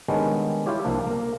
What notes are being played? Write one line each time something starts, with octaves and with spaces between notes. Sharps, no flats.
D#3 G3 G#3 B3 C#4 D4
E4 F4 G4 C#5
C2 F3 A#3 D4
A#3 A#4